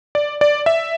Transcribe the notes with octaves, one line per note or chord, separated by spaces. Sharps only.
D5
D5
E5